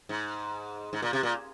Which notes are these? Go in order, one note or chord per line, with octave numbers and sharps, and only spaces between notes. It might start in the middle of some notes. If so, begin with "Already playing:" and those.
G#2
G#2
A#2
C3
A#2